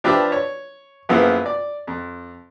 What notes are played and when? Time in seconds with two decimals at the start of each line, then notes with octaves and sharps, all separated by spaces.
0.04 F3 D4 G4 B4 D5 E5
0.32 C#5
1.09 F#2 F3 G#3 A#3 B3 E4
1.46 D5
1.87 F2